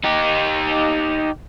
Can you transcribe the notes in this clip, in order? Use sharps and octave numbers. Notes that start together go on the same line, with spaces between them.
D#4 G4